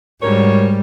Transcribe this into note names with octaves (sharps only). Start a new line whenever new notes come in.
D2 G#2 G3 C#4 A#4 C#5